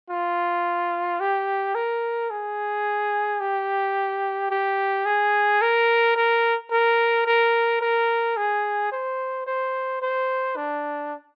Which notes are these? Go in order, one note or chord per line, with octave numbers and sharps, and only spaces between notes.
F4
G4
A#4
G#4
G4
G4
G#4
A#4
A#4
A#4
A#4
A#4
G#4
C5
C5
C5
D4